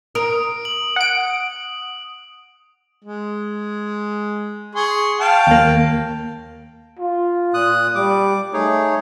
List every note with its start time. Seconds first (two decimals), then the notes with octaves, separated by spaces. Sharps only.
0.15 A#4 D#6 D7
0.65 F#7
0.96 F#5 D7
3.04 G#3
4.75 G#4 C6 C#6
5.20 F5 G5 A5
5.47 D#2 A#3
6.99 F4
7.54 A#2 D#6 F#6
7.95 G3 D6
8.53 A3 D#4 G#4 C#5